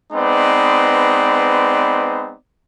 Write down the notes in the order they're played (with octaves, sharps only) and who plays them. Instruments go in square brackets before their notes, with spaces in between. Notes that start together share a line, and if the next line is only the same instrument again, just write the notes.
[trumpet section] G#3 B3 C4 D#4 B4 D5